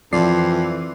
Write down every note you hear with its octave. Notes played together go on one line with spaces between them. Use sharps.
F2 E3 F3 D5 C7